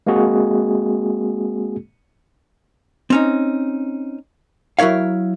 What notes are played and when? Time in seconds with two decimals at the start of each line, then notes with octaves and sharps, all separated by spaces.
0.07 G#3 A#3 C4 F#4 G#4
3.10 C4 C#4 D#4
4.79 F#3 E4 A#4 C#5 F5